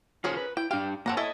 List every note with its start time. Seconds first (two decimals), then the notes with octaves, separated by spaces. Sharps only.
0.24 C#4 F4 G#4 A#4 C5 C#5
0.37 B4
0.57 E4 G5
0.71 D4 G4 F5 G5
1.06 A#3 C4 C#5 F#5 A5 A#5
1.17 E4 A4 C#5 D#5